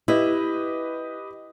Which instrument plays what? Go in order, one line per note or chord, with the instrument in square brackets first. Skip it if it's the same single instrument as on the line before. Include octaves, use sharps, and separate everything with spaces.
[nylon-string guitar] E4 [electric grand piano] G4 B4 D#5